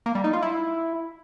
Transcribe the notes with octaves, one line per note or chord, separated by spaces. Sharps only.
A#3
G3
D#4
F4
E4